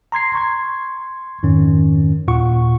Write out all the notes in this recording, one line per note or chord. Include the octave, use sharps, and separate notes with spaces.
A#5 C6 G#6 C7
C6 C#6 G#6
F2 G#2 D#3 C#4
D#2 A#2 F4 F#5 C#6